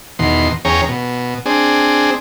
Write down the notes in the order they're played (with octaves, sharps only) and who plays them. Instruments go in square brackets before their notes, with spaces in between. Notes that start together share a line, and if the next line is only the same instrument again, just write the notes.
[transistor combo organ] E2 B2 D#3 C6
E2 C#4 G#4 C#5 G5 A#5
B2
C4 D4 G#4